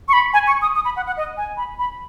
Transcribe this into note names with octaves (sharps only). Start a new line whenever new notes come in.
C#6
B5
G#5
C#6
D#6
D#6
B5
F#5
F#5
D#5
G#5
B5
B5